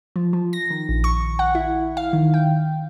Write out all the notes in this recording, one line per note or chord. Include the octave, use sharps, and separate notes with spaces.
F3
F3
A#6
D#3
A#1
C#6
F#5
E4
F5
D#3
G5